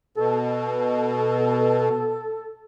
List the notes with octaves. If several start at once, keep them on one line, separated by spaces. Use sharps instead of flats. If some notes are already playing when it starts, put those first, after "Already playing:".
B2 A4